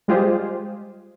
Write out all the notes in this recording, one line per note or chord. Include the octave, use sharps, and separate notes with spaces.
G3 G#3 F4 G4 G#4 C5